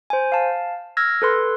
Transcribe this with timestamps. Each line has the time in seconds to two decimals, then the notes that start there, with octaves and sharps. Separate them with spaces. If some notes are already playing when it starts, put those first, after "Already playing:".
0.10 C5 G#5
0.32 F5 A5
0.97 E6 F6 G#6 A#6
1.22 A4 B4 C6